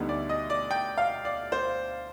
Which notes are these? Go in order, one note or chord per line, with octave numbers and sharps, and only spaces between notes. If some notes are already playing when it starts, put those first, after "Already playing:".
Already playing: D2 D3 G3 B3 D#4
D5
D#5
D5
G5
F5
D5
C5